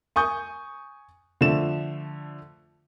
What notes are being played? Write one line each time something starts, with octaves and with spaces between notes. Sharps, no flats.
G#5 C#6 D#6 G6
D3 F3 A3 E7